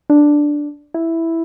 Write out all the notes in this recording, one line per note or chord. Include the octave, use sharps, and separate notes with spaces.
D4
E4